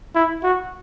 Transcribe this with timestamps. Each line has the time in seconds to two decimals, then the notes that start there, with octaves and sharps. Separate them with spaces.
0.15 E4
0.43 F#4